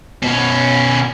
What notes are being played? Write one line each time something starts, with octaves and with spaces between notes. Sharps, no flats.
B2 C#4